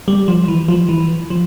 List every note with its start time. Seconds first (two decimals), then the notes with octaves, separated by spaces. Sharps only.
0.08 G3
0.28 F3
0.48 E3
0.68 F3
0.89 E3
1.30 F3